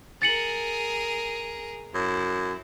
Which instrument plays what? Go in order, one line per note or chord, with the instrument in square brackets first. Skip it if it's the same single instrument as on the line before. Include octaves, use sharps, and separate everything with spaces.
[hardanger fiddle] G#4 A#4 [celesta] A6 C#7 F#7
[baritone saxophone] F#2 [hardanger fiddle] E4